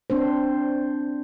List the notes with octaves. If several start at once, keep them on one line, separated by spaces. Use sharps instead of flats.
C4 D4 C5